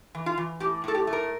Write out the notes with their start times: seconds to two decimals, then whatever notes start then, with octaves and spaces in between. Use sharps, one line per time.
0.15 E3
0.26 F4
0.38 E3
0.60 A2 G4
0.84 A2 A4
0.95 G4
1.07 A3
1.13 A#4